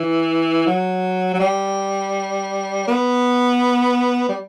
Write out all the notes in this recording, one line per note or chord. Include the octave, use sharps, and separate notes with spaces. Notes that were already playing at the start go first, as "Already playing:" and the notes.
Already playing: E3
F#3
F#3
G3
B3
G3